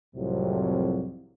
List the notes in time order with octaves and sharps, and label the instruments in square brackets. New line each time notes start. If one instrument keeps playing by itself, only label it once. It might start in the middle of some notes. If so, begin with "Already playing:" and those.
[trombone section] C2 F2 A2 C3 F#3